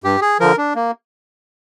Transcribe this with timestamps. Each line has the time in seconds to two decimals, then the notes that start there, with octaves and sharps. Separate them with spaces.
0.04 G2 G4
0.21 G#4
0.40 D3 F3 A#4
0.57 D4
0.75 A#3